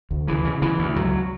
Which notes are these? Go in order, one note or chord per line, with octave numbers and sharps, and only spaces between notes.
D2
C#3 E3
C#3
C#3 E3
D2
C#2 F#3